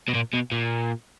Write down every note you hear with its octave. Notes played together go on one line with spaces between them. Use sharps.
B2
A#2
B2
A#2